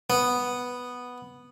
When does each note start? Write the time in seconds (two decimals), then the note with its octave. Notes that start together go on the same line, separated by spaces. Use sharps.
0.10 B3